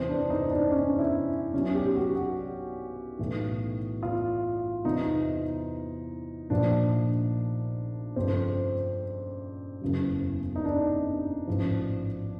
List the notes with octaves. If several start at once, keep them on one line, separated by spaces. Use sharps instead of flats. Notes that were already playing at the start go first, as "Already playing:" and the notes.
Already playing: E2 C3 E3 C4
D4
D#4
D4
C#4
E4
B1 B2 F#3 C#4
G4
F#4
F#4
B1 A2 E3
F4
E2 C3 E3 D#4
A#1 A#2 F3 D4
G1 F2 C#3 F3 C4
F#1 E2 C#3 F#3
D#4
D4
A1 G#2 F3